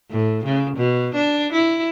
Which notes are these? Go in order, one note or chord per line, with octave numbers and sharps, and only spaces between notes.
A2
C#3
B2
D4
E4